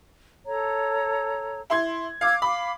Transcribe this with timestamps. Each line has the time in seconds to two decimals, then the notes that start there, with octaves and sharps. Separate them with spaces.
0.46 A4 C#5 A#5
1.70 E4 C6 G#6
2.21 F5 D6 E6 G#6
2.42 F5 B5 D6